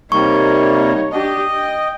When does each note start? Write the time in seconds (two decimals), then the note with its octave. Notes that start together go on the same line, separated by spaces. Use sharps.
0.12 C3 G3 A#3 D#4 C#5 C#6
1.12 D4 G4 D#5
1.54 G5